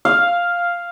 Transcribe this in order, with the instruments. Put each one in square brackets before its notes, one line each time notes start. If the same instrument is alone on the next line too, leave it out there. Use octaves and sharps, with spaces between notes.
[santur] F5